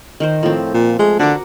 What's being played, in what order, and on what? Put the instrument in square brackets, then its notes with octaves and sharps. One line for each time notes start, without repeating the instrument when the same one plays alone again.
[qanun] D#3 A#4 C5
[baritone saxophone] A2 [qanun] F3 C4
[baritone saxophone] A#2
[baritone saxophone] G#3 [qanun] A3
[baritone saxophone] D3 [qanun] F#4 A#4 D6